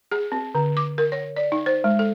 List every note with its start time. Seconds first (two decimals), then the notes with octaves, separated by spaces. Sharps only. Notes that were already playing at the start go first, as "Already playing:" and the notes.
0.12 G#4
0.32 C4
0.55 D3
0.77 D6
0.98 A#4
1.12 C#5
1.36 D5
1.52 D#4
1.66 C5
1.84 G#3
1.99 A4